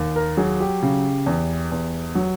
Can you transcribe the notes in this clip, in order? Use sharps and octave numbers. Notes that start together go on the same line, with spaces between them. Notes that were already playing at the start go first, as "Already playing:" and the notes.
Already playing: D#2
A#4
F#3 G#4
G4
C#3
E2
E2
F#3